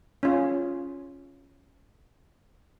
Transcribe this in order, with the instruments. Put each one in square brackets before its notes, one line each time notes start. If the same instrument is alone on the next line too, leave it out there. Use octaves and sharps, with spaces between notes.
[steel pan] C#4 F4